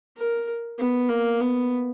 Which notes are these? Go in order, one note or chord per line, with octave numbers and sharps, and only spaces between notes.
A#4
B3
A#3
B3